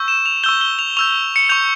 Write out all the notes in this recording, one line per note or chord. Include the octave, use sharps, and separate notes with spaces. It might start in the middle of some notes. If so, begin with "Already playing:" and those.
Already playing: C#6 E6 G6
E7
F7
C#6 E6 G6 G7
G7
F7
C#6 E6 G6 F7
C#7
C#6 G6 F7